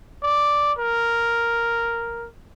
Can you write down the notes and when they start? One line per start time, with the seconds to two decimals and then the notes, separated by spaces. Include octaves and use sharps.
0.23 D5
0.78 A#4